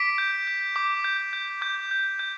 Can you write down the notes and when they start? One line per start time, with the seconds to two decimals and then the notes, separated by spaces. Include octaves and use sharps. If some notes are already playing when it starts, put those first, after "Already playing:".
Already playing: D6 B6 D7
0.18 G6
0.47 G6
0.76 D6
1.04 G6
1.33 G6
1.62 D6 G6
1.91 G6
2.19 G6